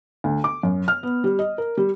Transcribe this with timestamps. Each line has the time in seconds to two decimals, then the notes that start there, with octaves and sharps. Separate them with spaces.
0.24 D2
0.44 D6
0.63 F#2
0.88 F6
1.03 B3
1.24 G3
1.39 D#5
1.58 A#4
1.77 G3